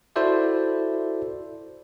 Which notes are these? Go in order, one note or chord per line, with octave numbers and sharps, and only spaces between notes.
E4 F#4 A4 C5 D5 E5